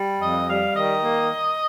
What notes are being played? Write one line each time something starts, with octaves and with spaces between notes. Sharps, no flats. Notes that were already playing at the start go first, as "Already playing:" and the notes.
Already playing: G3
F2 D#5
G3 F5
D#3 D#5
A#3